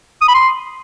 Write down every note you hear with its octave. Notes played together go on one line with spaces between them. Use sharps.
D#6
B5
C6